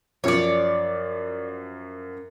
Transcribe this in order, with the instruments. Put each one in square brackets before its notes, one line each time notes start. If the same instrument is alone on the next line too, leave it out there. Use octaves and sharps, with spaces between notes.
[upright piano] F#2 F3 [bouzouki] C#5 D5